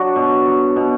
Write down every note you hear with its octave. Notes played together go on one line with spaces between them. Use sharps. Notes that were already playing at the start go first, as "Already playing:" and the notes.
Already playing: F#3 D4 F#4
B2
F#3
B2